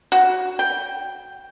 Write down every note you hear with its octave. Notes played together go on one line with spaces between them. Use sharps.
F#4
G5